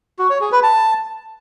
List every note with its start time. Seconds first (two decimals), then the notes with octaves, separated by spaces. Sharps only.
0.19 F#4
0.30 C#5
0.41 G#4
0.52 B4
0.63 A5